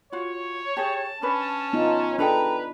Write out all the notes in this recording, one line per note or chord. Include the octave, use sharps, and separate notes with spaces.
F4 F#4 C#5
G4 G#4 A5
C#4 D4 B4
B3 D#4 F4
D4 G#4 A4 B4 G5 A#5